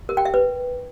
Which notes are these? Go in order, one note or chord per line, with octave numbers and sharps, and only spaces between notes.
A#4
G5
E5
B4